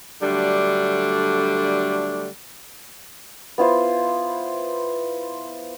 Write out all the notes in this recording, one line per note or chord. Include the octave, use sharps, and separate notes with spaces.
D3 F#3 G3 A3 D4
B3 E4 F4 C5